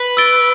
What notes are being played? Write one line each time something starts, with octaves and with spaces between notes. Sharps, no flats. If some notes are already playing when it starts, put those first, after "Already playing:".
Already playing: B4
E6 A6 D7 G7